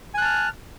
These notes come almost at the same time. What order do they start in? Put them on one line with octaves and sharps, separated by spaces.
G#5 F#6 A5 F6